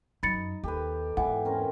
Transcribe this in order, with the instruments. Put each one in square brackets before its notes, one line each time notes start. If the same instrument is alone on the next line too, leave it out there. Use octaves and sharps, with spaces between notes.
[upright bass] F#2 [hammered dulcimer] D#4 [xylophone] B5 A6 C#7
[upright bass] D#2 [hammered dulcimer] G4 A4 B4
[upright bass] E2 G#2 [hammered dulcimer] E3 [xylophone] F#5
[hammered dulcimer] C4 C#4 A#4